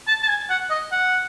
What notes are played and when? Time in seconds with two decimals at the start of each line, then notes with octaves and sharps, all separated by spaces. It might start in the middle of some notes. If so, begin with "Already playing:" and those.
0.07 A5
0.23 A5
0.28 G#5
0.50 F#5
0.71 D#5
0.91 F#5